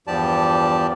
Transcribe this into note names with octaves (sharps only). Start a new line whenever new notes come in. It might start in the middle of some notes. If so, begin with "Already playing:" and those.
E2 G2 F3 G4 D5 A5